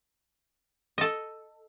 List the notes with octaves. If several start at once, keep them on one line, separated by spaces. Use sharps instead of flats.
A4 D#5